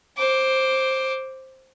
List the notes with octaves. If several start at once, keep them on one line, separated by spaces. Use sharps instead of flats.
C5 D6